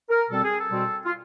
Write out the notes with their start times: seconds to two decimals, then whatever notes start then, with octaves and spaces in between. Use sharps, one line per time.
0.09 A#4
0.29 B2 G3 C4 A4
0.43 G#4
0.57 A4
0.70 B2 G3 C4
1.05 F4